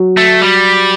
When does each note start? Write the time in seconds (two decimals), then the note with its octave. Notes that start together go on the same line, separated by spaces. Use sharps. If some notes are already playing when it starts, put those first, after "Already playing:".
Already playing: F#3
0.17 A3
0.41 G3